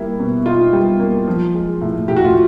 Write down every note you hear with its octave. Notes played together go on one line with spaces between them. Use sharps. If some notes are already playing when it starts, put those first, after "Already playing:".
Already playing: G3 A#3 E4
B2
D#4 F4
G3
A#3
F3
G#3
A2
A2 G4
F#4
F4